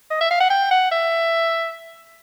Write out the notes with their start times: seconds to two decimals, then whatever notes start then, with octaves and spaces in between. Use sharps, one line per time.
0.10 D#5
0.21 E5
0.31 F5
0.40 F#5
0.50 G5
0.71 F#5
0.91 E5